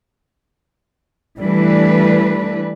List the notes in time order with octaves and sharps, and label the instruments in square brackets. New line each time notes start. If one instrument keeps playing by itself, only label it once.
[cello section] E3 D4 B4 [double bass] G3 A3